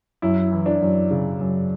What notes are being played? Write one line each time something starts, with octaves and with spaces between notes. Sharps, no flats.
F#2 E4
E3
D4
F#2
C#3
F#2